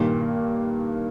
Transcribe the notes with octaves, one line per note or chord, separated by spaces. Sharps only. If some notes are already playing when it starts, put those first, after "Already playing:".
Already playing: G2 A#2 D#3 A#3
A#2